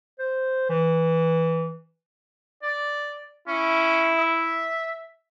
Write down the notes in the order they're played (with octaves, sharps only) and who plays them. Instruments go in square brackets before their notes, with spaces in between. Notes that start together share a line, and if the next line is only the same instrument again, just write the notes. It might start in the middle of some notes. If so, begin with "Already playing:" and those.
[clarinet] C5
E3
[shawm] D5
[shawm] C#4 [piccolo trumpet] E4
[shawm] E5